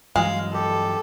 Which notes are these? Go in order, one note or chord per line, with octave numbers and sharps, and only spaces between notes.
G2 E3 F#3 G#3 F5
G4 A4